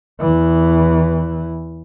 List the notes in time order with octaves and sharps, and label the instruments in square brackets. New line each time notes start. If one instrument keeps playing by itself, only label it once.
[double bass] E2 E3